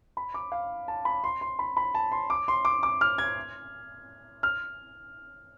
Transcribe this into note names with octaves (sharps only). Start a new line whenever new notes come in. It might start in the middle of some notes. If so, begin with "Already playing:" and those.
B5
D6
F5
A5
B5
C6
C6
B5
B5
A5
C6
D6
C6
D6
D6
F6
G#6
F6